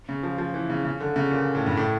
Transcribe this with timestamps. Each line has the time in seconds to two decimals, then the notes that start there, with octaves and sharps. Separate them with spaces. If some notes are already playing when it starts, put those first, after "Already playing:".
0.09 C#3
0.23 F3
0.38 F3
0.54 E3
0.70 C#3
0.85 C#3
1.00 D3
1.16 C#3
1.31 A#2
1.55 A2
1.66 G2
1.77 A2